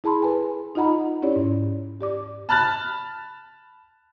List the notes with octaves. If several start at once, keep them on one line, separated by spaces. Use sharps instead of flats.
E4 G#4 A5 B5 C6
A4 B4 G#5
D#4 F4 D#5 F#5 A#5 B5
C#4 E4 G4 C#5 D5
G#2
G4 D5 D6
A5 B5 F6 F#6 A6